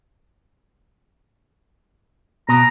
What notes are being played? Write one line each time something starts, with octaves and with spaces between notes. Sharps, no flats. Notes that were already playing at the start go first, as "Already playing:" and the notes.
B2 A#5